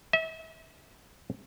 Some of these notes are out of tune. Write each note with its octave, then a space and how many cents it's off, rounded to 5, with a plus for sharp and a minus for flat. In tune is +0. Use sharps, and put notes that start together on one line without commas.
E5 -35